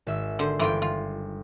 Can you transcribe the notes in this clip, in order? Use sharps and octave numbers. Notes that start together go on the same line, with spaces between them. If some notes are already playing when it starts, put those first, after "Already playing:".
G#1 E5 E6
D3 C5
G1 E3 F4 G5
F4